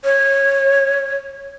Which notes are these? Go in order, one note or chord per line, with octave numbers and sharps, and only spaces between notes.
C#5